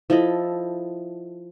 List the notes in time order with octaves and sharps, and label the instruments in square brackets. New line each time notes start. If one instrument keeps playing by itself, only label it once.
[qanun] F3 E4 A4 D#5